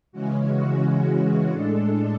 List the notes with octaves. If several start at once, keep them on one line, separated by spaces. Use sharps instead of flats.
C#3 E3 G#3 C#4 F#4
F#4
A2 G#3 D4 A4